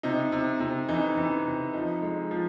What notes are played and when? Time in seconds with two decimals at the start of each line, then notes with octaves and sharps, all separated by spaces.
0.03 C3 D#4
0.32 C3
0.60 C3
0.89 E3 D#4
1.17 E3
1.46 C3
1.73 F3 D#4
2.02 G#3
2.31 F3